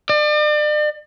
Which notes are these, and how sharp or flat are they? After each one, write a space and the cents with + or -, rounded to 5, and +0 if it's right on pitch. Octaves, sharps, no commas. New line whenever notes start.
D5 +40